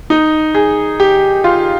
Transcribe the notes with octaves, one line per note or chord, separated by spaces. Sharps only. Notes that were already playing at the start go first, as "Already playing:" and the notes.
D#4
G#4
G4
F4